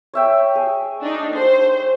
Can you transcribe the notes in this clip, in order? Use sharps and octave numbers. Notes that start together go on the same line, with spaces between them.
C#5 E5 G5
G#4
D4 D#4
C5